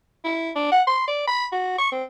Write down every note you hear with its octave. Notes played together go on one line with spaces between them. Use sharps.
E4
D4
F#5
C6
D5
B5
F#4
C#6
C4